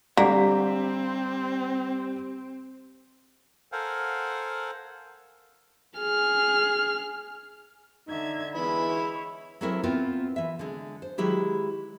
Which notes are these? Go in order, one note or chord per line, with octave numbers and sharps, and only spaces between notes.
D3 G3 A#3 C4 G4 B6
A4 A#4 C5 F5 F#5 G#5
G#4 F6
D3 D#4 E5 G#6
E3 G#3 B3 E5 B5
E4 C#5
F#3 G#3 A3 C4 E4 A#4
B3 C4 E4 F4 A#4
E3 E5
D3 G#3
C5
D#3 F#3 G#3 E4 G4